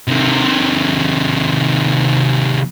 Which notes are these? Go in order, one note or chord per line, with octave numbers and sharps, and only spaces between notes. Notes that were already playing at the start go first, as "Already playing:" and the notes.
C3 D#3